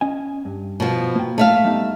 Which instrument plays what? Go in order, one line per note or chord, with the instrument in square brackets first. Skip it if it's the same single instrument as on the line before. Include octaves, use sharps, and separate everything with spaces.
[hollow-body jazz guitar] C#4 D#5 G#5
G2
[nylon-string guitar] B2 F3
[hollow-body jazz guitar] A#3 G5
[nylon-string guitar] A3 E5 F5
[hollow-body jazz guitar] G3 B3 D#4